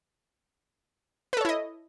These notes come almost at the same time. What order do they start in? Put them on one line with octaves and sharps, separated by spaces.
B4 A4 C#5 E4 D#5